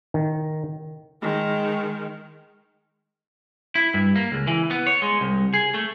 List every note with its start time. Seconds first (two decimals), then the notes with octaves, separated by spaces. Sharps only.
0.14 D#3
1.22 D#3 G#3
3.75 E4
3.94 G2
4.16 A#3
4.32 C#2
4.47 E3
4.71 B3
4.87 C#5
5.02 G#3
5.21 C2
5.54 G#4
5.74 A3